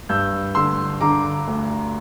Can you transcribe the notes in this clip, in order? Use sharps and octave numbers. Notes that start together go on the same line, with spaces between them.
G2 E6 G6
D3 C6 E6
D3 A#5 D6
D2